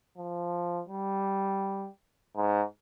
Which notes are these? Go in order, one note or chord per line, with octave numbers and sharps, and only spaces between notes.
F3
G3
G#2